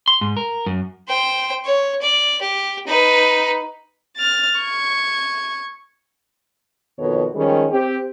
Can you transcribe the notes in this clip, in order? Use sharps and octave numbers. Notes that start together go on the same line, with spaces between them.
C6
G#2
A#4
F#2
C5 G5
C#5
D5
G4
D#4 B4
F6 A6
C#6 G#6
F2 B2 D#3 A4 C#5
D#3 F3 G3 G#3 C#4
C4 G4